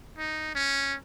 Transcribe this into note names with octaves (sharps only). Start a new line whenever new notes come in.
D#4
C#4